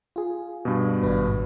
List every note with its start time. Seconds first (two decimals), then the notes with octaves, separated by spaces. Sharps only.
0.16 F4 G#4
0.65 G2 B2
1.03 G#1 D4 B4